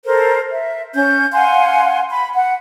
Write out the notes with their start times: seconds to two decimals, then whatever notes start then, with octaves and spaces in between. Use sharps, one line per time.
0.05 A4 A#4 C5
0.51 E5
0.94 C#4 G6
1.32 F5 F#5 G#5 C6
2.10 B5
2.34 F#5